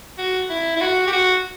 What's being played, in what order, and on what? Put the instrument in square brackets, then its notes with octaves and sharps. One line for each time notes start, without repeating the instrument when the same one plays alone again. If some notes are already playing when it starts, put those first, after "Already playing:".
[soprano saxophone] F#4
E4
E4
F#4
G4
F#4